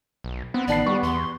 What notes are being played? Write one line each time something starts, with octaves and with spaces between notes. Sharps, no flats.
B1
B3 C4
A1 D#3 D5 A5 C7
G3 G4 C#6
E2 C6